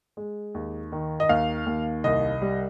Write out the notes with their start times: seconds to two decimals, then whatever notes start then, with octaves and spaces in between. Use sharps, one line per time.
0.17 G#3
0.55 D#2
0.92 D#3
1.20 D#5
1.29 D#2 F5
1.66 D#2
2.04 C2 D#5
2.42 G3